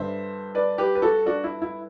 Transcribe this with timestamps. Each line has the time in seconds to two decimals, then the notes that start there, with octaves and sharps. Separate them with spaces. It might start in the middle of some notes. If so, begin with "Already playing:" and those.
Already playing: G2 D3 C5 E5
0.55 B4 D5
0.78 G4 B4
0.95 B4
1.02 F#4 A4
1.26 D4 F#4
1.44 E4
1.62 E4